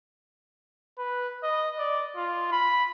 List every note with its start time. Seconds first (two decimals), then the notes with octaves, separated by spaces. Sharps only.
0.98 B4
1.43 D#5
1.78 D5
2.16 F4
2.52 B5